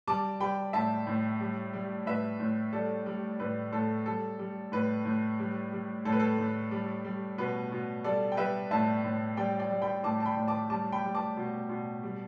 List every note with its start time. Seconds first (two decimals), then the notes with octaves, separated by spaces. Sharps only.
0.07 G3 A5 D6
0.40 G3 G5 B5
0.73 A2 E5 A5
1.07 A2
1.40 G3
1.73 G3
2.06 A2 B4 E5
2.40 A2
2.73 G3 A4 D5
3.06 G3
3.40 A2 B4
3.72 A2 A4
4.06 G3 A4
4.39 G3
4.72 A2 B4
5.05 A2
5.39 G3
5.72 G3
6.05 A2 A4
6.12 B4
6.20 A4
6.38 A2
6.71 G3
7.05 G3
7.38 B2 B4
7.72 B2
8.04 G3 A4 D5
8.32 G5
8.37 G3 B4 E5
8.71 A2 E5 A5
9.04 A2
9.37 G3 D5 G5
9.59 D5 G5
9.70 G3
9.82 G5 B5
10.03 A2 A5 D6
10.20 A5
10.26 G5 B5
10.37 A2
10.48 A5 D6
10.70 G3 A5 D6
10.92 G5 B5
11.04 G3
11.15 A5 D6
11.37 B2
11.69 B2
12.03 G3